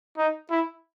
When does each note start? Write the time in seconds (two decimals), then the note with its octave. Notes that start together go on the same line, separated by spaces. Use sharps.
0.17 D#4
0.51 E4